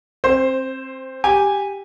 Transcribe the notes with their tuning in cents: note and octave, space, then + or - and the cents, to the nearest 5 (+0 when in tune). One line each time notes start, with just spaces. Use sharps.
C4 +25 C5 +0 C6 +0
G4 +0 G#5 -15